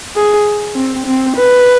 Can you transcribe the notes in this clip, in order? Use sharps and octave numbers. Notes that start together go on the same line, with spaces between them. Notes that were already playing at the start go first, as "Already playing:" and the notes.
G#4
C4
C4
B4